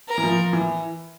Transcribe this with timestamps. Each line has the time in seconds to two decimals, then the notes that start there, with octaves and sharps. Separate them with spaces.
0.09 A#4
0.18 E3
0.23 F3
0.53 E3